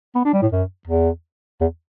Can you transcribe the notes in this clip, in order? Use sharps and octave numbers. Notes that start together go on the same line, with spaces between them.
B3
D4
G3
A2
F#2
E2
E2